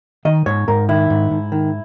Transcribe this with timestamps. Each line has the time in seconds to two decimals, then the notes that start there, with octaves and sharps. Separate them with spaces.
0.25 D#3 D#5
0.46 G#2 C#5
0.68 G#2 A#4
0.89 D#3 E4
1.10 G#2
1.31 G#2
1.52 D#3